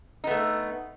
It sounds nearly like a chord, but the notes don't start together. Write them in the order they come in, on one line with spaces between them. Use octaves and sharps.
D#4 B3 A3